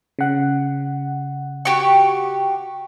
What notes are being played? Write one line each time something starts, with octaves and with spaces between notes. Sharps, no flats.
C#3 F#5
F#4 G4 C#6